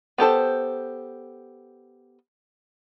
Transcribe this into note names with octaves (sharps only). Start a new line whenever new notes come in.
B3 G4 A4 C5